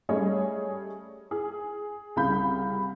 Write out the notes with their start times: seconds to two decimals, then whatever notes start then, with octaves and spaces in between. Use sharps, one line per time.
0.09 G3 A3 C#4 G#4 C#5 D#5
1.31 G#4
2.16 C2 C#3 F5 B5 G6